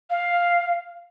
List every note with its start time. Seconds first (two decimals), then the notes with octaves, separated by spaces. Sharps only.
0.10 F5